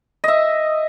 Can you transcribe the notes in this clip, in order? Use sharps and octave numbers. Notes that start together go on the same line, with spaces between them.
D#5 E5